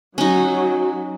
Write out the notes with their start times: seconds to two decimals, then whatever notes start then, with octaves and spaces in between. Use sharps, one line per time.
0.18 F#3 C#4 D#4